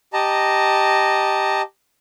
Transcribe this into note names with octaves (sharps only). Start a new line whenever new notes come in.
G4 D#5 A5 A#5